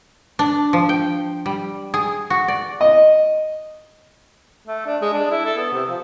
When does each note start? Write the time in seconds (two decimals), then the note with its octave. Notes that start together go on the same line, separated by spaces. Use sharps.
0.39 D4
0.73 F3
0.89 G5
1.46 G3
1.94 G#4
2.30 F#4
2.48 D5
2.81 D#5
4.67 A3
4.87 D4
5.01 G#3
5.13 D4
5.31 E4
5.45 A4
5.57 B3
5.73 C3
5.89 F3